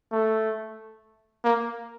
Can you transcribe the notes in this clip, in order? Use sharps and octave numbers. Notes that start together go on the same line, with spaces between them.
A3
A#3